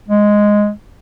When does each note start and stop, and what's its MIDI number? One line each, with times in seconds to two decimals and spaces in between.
0.08 0.70 56